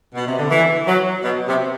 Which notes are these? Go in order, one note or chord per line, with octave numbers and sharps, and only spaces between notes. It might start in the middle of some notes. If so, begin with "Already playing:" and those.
B2
C3
D3
E3
F#3
B2
C3